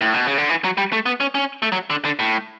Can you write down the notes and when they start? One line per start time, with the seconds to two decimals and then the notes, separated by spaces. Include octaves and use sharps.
0.01 A2
0.14 B2
0.26 C#3
0.38 D3
0.49 E3
0.64 F#3
0.78 G3
0.93 A3
1.06 B3
1.20 C#4
1.35 C#4
1.62 A3
1.72 F#3
1.90 D3
2.05 D3
2.19 A2